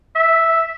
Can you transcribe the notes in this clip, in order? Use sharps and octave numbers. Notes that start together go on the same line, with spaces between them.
E5